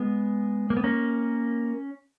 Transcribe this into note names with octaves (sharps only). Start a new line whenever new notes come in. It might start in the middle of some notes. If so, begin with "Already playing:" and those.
Already playing: G#3 B3
A#3
B3
A#3 C#4